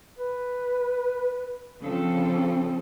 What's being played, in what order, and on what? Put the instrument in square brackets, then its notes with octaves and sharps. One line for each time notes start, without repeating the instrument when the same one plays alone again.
[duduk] B4
[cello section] C#3 F3 A4 [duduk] C4